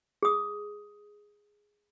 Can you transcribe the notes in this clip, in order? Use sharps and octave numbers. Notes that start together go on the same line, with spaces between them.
G#4 D#6